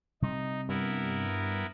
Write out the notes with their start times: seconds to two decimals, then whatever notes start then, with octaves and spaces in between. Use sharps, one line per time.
0.22 C3 G3 C4 D#4
0.69 G2 B3 E4 A#4